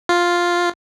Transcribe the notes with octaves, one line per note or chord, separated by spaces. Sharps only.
F4